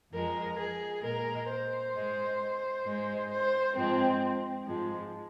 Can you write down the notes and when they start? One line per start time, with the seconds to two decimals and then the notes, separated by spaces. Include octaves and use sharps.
0.12 F2 F3 G#3 A#4
0.58 G#4
1.03 A#2 G#3 A#4
1.49 C5
1.93 G#2 G#3
2.84 G#2 G#3
3.30 C5
3.75 G#2 F3 G#3 C4
4.66 G#2 F3 G#3